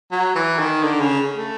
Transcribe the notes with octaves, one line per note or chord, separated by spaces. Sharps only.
F#3
E3
D#3
D3
C#3
A3